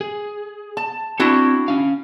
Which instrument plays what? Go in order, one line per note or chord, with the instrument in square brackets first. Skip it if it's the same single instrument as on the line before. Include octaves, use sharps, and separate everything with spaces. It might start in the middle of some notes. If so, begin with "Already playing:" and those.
[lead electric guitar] G#4
[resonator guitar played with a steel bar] A5
[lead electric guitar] C4 [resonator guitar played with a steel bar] D4 E4 F#4
[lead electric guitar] C#4 F5